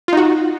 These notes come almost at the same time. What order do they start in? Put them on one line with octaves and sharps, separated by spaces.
F4 D#4 F#4